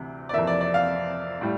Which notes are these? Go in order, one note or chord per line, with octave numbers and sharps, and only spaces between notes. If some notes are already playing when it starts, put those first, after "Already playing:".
Already playing: D2 C3 E3
D5
F2 C3 E3 A#3 E5
D5
D5
F5
A2 G3